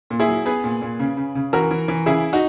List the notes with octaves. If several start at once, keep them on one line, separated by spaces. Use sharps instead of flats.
A#2
E4 G#4
F#3
B3 G#4 B4
A#2
A#2
C#3
C#3
C#3
E3 F#4 A#4
E3
E3
C#3 E4 G#4
D#4 F#4